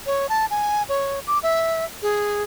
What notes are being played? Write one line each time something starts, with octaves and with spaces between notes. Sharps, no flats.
C#5
A5
G#5
C#5
D6
E5
G#4